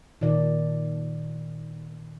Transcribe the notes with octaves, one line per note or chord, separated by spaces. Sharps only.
A#2 D#3 D5